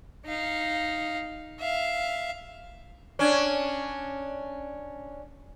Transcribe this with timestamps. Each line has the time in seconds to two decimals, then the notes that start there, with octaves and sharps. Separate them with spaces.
0.26 D#4 F5
1.60 E5 F5
3.19 C#4 D4